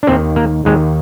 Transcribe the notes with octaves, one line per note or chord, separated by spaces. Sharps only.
D4
D#2 D#3 C4
A#3
D#2 D#3 G#3